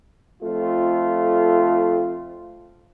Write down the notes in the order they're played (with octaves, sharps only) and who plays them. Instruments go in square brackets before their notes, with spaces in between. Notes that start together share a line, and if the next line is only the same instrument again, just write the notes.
[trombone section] F2 A3 F4